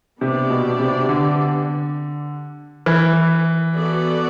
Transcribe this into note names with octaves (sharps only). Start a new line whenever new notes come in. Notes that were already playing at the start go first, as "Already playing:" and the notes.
C3 B3 D4 G4 D5
B2
C3
D3
E3
B3 F#4 A4 D5